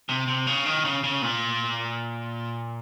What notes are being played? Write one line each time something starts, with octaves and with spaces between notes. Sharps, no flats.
C3
C3
C#3
D#3
C#3
C#3
A#2